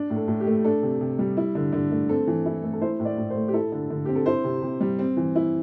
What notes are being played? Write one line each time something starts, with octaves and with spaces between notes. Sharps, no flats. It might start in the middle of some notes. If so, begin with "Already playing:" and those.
Already playing: D4
A2
A4
A2
G4
A3
D4 A4
C3
C3
G3
E4
D3
D3
A3
C4 A4
E3
E4
A3
A4
E4 C5
A2
D5
A2
C5
A3
G4
E4 A4
D3
D3
C4 G4
A4
E4 C5
C3
C3
G3
C4
E3
E4